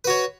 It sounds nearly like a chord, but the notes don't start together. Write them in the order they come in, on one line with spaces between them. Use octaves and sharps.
B4 F#4 C#5